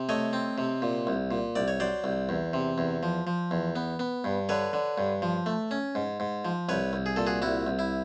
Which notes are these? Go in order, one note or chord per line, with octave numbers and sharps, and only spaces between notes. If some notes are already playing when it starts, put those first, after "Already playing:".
Already playing: C3
A3 C#5 D#5
C4
C3
A#2
C2
A#2
C2 D5
C#5
F#3 C5 D5
C2
E2
C3
E2
F3
F3
E2
B3
B3
G2
D3 B4 C#5
D3
G2
F3
A3
C#4
G#2
G#2
F3
C2 B4 C#5
C2
G#4
A#2 A4
F#4 G#4
C2 E4 F#4
C2
E4